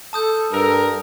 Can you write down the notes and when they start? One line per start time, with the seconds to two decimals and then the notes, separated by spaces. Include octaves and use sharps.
0.13 A4 A5 D#6 G6
0.53 G2 A#4